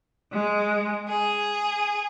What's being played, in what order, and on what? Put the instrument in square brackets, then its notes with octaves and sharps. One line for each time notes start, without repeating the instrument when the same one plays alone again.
[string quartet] G#3
G#4